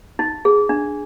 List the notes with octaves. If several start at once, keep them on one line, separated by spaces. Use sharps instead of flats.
D#4
G#4
D4